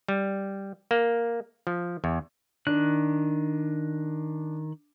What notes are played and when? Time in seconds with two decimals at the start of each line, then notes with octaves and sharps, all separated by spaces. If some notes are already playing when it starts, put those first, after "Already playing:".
0.08 G3
0.91 A#3
1.67 F3
2.04 E2
2.67 D#3 D4 F#6